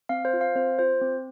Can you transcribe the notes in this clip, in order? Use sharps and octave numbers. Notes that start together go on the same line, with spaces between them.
C4 F5
C5
F4
F5
C4 C5
F4 C5
C4